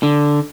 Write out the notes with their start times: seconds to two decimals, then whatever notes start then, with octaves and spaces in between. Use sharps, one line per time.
0.03 D3